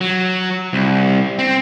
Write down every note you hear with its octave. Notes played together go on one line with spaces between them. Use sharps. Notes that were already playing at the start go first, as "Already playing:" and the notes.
F#3
C2
C4